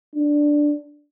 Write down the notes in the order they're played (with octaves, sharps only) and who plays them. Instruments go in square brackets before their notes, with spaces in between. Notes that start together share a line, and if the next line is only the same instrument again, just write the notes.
[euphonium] D4